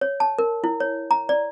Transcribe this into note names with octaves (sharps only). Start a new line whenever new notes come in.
C#5
A5
A#4
E4
C#5
A#5
D5